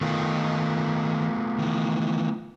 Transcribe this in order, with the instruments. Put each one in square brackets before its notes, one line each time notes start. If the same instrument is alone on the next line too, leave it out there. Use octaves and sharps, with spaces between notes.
[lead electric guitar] D#3 [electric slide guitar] A3 B3 F4
[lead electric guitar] D#3 E3